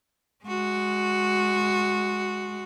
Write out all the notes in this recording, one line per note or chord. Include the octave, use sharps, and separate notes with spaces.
G#3 F#4